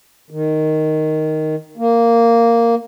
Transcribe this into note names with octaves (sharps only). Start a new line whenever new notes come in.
D#3
A#3